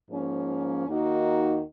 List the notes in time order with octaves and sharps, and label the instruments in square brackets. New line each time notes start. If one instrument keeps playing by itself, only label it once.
[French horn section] G#2 F3 A#3 C#4
D#2 D#3 A#3 D#4 F#4